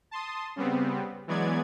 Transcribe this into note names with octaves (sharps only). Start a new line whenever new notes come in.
A5 C6 D#6
C#3 G3 B3 C4
E3 F#3 G#3 B3 D5 G#6